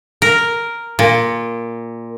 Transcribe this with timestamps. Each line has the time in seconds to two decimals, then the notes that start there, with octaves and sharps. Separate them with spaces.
0.22 A#4
0.99 A#2